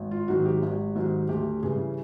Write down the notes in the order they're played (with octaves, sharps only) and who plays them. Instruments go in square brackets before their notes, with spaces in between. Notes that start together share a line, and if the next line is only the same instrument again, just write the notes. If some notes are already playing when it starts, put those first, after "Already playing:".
Already playing: [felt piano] G#1
F4
G#2 D#3 F#3 F#4
G4
G#1
G#2 D#3 F#3
D2 G4
C#3 E3 G3 G#4